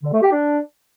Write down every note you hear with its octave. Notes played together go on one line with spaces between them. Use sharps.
D3
A3
G4
D4